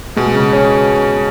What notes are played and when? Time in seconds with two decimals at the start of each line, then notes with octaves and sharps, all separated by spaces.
0.16 B2 G#3
0.34 C#3
0.53 C#4